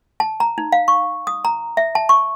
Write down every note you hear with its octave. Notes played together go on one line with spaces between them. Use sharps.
A5
A#5
D#4
F5
C#6
D#6
A#5
E5
A5
C#6